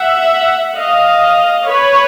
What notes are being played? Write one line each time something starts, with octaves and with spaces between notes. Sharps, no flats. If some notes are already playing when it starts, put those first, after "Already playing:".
Already playing: E5 F#5
D#5 F5
B4 C#5